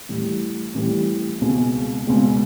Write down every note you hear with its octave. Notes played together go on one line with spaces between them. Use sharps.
A2 E3 G3
A2 E3 G3
C#2 B2 G#3 C4
C#2 B2 G#3 C4